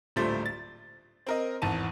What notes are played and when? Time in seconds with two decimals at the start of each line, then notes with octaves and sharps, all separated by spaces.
0.16 D1 A#2 G3 A3 C5 A6
0.46 A6
1.27 C4 A#4 D#5
1.62 G#1 E2 A5 D#7